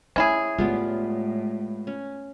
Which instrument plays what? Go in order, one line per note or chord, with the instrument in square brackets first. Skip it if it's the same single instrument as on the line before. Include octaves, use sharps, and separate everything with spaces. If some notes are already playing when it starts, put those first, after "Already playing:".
[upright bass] A3 [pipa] C#4 E4 G#4
[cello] A2 [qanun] G3 B3 F4 [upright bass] G#3
[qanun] C#4